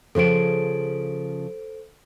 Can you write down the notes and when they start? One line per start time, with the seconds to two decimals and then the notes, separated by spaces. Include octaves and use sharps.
0.15 C#3 F3 G#4 A4 C5 D7